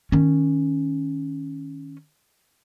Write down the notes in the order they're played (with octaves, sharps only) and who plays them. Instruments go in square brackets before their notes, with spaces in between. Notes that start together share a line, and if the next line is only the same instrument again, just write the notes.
[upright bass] D#3 C#4